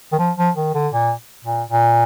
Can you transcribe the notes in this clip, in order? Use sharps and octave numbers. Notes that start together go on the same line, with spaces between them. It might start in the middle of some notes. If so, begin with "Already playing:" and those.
D#3
F3
F3
D#3
D3
A#2
A#2
A#2